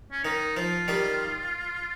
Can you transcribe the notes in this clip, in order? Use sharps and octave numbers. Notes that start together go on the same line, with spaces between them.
C#4
D#3 D#4
F3 F4
D#3 G3